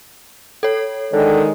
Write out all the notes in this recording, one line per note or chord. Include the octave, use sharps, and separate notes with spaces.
A4 C#5
D3 D#3 G#3